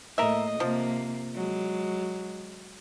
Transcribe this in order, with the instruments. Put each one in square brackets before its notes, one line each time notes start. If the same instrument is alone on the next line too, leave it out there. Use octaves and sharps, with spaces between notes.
[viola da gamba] A2 A#3 D#5 [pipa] A#4 E5
[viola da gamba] C3 A#3 [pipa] F3
[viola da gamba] F#3 G#3